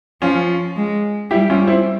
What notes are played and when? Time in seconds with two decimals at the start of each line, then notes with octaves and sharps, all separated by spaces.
0.21 F3 C#4 F4
0.76 G#3
1.31 G3 E4 G4
1.50 C#4 F4
1.67 C4 E4